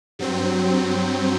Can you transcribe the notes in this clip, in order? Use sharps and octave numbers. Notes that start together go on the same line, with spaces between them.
G2 F#3 C4